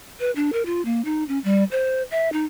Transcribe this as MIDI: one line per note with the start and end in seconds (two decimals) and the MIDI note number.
0.20 0.31 71
0.36 0.50 62
0.53 0.65 70
0.66 0.84 65
0.85 1.04 58
1.05 1.24 63
1.28 1.39 61
1.44 1.64 55
1.71 2.03 72
2.11 2.31 76
2.33 2.45 63